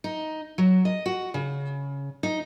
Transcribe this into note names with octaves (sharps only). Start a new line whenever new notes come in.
D#4
F#3
D#5
F#4
C#3
D#4